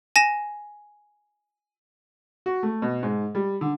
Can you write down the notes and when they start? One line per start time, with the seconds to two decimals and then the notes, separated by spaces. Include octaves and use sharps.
0.16 G#5 A#6 E7
2.46 F#4
2.63 A3
2.82 B2
3.03 G#2
3.35 G3
3.61 D3